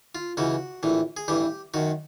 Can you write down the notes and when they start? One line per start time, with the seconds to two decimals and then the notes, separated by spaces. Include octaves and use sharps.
0.15 F4
0.37 C#2 C#3 E3 F#4
0.83 A#1 A2 E3
1.17 G#4
1.28 A1 G2 E3 G4
1.74 F#2 D#3 F#4